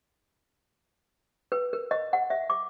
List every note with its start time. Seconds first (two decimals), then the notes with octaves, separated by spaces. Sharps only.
1.52 B4
1.73 A#4
1.91 D#5
2.13 F#5
2.30 E5
2.50 D6